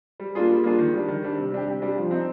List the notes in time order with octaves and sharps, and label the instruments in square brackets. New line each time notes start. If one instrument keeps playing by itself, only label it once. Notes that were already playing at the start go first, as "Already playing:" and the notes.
[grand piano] G3
A#3 D4 F4 G#4
G3
A#3 D4 F4 G#4
D#3
G3 D4
D#3
G3 D4
C3
G3 D4 G4
C3
G3 D4 G4
F3
C4 D#4